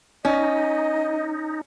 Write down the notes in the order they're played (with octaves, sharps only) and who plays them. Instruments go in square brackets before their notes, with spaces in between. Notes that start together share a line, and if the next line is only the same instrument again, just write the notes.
[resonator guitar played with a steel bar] C#4 [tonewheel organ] D#4 [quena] D#5